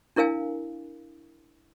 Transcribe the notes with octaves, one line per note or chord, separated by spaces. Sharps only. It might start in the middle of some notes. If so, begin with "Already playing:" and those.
D4 E4 A#4 F5 G#5